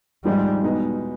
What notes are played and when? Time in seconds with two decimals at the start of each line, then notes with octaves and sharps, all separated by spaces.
0.24 G#1 G#2 F3 G3 G#3
0.62 E2 B2 G#3 B3 D#4